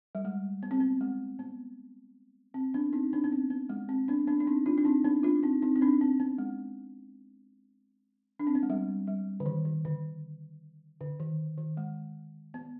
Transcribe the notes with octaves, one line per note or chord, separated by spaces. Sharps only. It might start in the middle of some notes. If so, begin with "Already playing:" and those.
G3
G#3
B3
C4
B3
G#3
B3
C4
B3 D4
C4 D#4
B3 D4
B3
C4
B3
G#3
C4
B3 D4
B3 D4
D4
C4 D#4
D4 F4
D4
C4 D#4
B3 D4
D4 F4
C4 D#4
C4 D#4
C4
B3 D4
C4
B3
G#3
D4
C4
B3
G#3
G3
G3
D3
D#3
D#3
D3
D3
D#3
D#3
G#3
B3